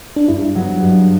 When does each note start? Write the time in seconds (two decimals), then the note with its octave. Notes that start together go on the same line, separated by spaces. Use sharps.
0.16 D4
0.28 G2 E4
0.55 F#3 B3
0.82 G2